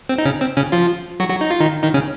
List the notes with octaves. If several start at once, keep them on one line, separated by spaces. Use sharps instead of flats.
C4
D#4
C#3 C#4
C4
C#3 C#4
F3 F4
F#3 F#4
F#3 F#4
D#4
F4
D#3 D#4
D#3 D#4
C#3 C#4